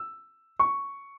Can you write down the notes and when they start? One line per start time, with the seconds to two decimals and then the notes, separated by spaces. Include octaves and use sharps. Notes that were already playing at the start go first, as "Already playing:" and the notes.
Already playing: E6
0.59 C#6